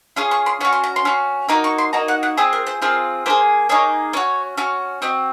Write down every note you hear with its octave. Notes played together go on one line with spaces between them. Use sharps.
C#4 F4 G#4 C#6
C#6
C6
C#4 F#4 C#6
C6
A#5
C6
C#4 F#4
A#3 D#4 F#4 A#5
C#6
C6
A#3 D#4 F#4 A#5
F#5
F#5
C4 F4 G#4 G#5
A#4
C5
C4 F4 G#4 A#4
A#3 D#4 G#4 C5
A#3 D#4 G#4 C#5
C#4 F#4 C#5
C#4 F#4
C4 F#4 D#5